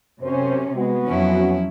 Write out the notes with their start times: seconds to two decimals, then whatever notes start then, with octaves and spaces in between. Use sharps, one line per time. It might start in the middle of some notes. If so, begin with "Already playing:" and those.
0.22 F#2 C3 C#4 C5
0.77 G#3 B3 F#4
1.07 F2 F3 F#3 C#4 E4